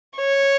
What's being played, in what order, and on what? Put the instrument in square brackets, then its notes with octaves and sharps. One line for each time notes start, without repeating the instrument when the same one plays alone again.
[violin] C#5